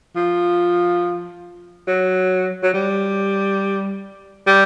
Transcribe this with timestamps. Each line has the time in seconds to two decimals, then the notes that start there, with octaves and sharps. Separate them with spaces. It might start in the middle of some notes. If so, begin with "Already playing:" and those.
0.16 F3
1.87 F#3
2.63 F#3
2.74 G3
4.47 G3